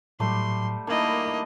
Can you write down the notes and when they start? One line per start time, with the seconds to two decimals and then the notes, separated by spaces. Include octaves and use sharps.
0.20 A2 F#3 G3 A3 G4 C6
0.87 D#3 A#3 D4 E4 D#5 A5 B5